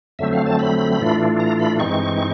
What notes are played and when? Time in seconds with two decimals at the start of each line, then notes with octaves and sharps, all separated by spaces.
0.19 F2 D3 F#3 A3 C4 E5
0.33 F5
0.46 A5
0.59 B5
0.99 A2 E3 A3 D4 F4
1.40 A#5
1.59 B5
1.80 G2 E3 G#3 C4 D#4 C#6